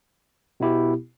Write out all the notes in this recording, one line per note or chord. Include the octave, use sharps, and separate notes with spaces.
B2 B3 E4 G4